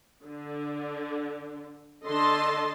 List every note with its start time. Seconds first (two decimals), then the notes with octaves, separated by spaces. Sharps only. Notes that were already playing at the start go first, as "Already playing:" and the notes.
0.24 D3
2.06 D3 A4 D#5 A5 C6